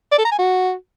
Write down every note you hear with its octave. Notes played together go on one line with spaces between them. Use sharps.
D5
A4
A#5
G#5
F#4